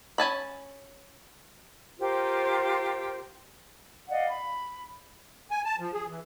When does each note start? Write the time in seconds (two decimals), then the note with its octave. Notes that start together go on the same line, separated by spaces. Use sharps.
0.18 C#4 G#5 A5 B5
1.99 F4 G4 A#4 C5
4.09 D5 D#5 F5 F#5
4.28 B5
5.51 G#5
5.65 A5
5.79 F3
5.93 G#4
6.08 E3